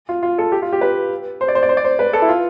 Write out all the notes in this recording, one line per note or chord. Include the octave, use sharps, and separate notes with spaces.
F4
F4
A4
G4
F4
G4
B4
C5
D5
C5
D5
C5
D5
C5
B4
A4
E4
F4